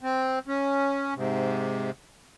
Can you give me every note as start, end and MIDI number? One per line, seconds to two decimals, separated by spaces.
0.01 0.39 60
0.48 1.14 61
1.16 1.91 44
1.16 1.91 48